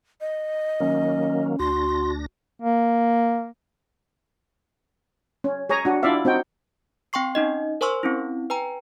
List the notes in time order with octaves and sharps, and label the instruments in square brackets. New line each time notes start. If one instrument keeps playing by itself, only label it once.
[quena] D#5
[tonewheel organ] D#3 F#3 A#3 [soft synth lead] C#4
[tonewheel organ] D2 D4 A#6 [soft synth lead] F#4 [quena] C6
[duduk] A#3
[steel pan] C#4
G#4 C#5 G#5 A#5
D4 F#4
D4 E4 F4 D5 E5 F5
C4 D#4 F#4 G5
[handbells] C4 G5 C6 C#6 C7
C#4 D#4 D#5
A#4 C5 G#5 C6 C#6 E6
C4 C#4 E4
B4 G5 G#5 A#5